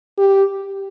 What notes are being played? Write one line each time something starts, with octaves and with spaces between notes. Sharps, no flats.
G4